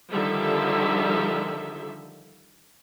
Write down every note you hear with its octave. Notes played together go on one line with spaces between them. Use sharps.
D3 D#3 F3 G3 A4 E5